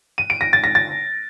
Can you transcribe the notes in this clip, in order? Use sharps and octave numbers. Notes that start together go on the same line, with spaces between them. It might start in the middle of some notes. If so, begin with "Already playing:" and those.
D#7
D7
A#6
A6
A#6
A6